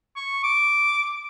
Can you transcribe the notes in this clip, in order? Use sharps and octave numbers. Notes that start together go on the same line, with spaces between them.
C#6
D6